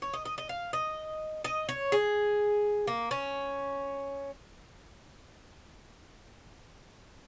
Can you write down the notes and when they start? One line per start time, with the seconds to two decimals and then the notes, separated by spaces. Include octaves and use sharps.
0.02 C#5
0.14 D#5
0.25 D#5
0.38 D#5
0.49 F5
0.73 D#5
1.44 D#5
1.69 C#5
1.92 G#4
2.87 A#3
3.11 C#4